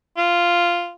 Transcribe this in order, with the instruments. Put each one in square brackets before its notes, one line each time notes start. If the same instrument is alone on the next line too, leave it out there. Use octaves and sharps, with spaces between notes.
[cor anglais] F4